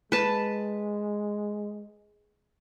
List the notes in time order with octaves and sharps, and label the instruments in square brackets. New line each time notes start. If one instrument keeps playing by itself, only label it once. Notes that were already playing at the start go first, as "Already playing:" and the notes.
[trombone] G#3 [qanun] B4 A5